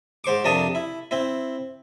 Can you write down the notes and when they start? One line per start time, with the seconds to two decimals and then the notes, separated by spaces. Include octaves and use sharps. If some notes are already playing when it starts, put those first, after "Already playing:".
0.24 G#2 C5 C#6 D6
0.44 F2 C3 D4 A#4 A5 D#6
0.75 E4
1.11 C4 E4